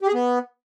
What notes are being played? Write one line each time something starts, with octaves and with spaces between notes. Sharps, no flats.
G4
G#4
B3